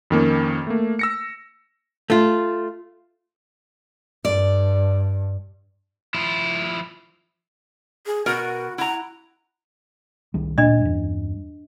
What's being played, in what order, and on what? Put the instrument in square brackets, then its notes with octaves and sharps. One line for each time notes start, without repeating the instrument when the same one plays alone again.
[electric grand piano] F2 D#3 A#3 C#4
A3 A#3
E6 A#6 C#7
[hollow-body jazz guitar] A3 F4
[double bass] G2 [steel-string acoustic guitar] D5
[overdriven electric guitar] F3 E4
[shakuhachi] G#4
[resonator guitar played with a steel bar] B2 A#4 [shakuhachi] F#4
[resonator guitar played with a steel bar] E4 A#5 [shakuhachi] F#5
[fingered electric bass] C2 D#3 G3
[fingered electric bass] D1 A#2 [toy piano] D4 D#5
[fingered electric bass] E2 G2